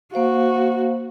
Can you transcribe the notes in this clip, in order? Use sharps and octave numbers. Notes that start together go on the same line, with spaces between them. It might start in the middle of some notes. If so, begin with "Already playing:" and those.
A#3 F#4 C5 F5